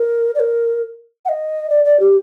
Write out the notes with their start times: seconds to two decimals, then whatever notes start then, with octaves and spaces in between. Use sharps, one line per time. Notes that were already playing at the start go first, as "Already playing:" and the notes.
Already playing: A#4
0.35 D5
0.40 A#4
1.25 F#5
1.29 D#5
1.70 D5
1.85 D5
2.00 G4